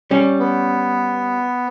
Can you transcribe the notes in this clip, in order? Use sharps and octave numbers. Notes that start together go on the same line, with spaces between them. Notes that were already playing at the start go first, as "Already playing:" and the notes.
G3 C#4
B3